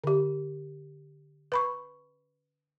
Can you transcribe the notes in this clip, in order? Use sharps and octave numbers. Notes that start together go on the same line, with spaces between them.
D3 G4
B4 B5 C#6